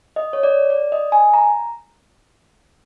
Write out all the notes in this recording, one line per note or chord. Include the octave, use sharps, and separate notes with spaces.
D#5
C#5
D5
D5
D#5
G#5
A#5